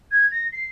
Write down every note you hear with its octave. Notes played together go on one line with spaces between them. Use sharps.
G#6
A#6
C7